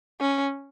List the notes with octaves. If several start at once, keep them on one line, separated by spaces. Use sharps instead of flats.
C#4